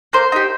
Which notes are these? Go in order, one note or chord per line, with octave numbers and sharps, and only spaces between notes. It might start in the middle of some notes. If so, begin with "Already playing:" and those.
A#3 C5
D#4 G4